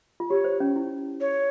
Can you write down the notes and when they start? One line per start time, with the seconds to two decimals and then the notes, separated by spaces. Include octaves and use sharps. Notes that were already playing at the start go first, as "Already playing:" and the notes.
0.20 F4
0.30 G4 C#5
0.44 C5
0.60 C#4
0.76 E4
1.21 C#5